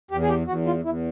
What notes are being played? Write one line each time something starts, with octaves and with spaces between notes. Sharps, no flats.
E2 G4
G#4
G4
E2 F#4
F4
E2 E4